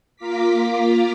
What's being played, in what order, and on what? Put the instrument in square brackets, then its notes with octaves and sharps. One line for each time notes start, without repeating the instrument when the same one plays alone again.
[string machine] A#3 F4 F5 A#5 D6 B6